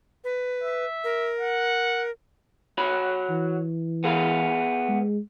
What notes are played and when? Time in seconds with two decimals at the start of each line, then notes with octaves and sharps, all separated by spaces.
0.24 B4
0.63 E5
1.04 A#4
1.40 F#5
2.78 F#4 C#5 B5
3.30 E3
4.04 B3 G#4 F5
4.89 G#3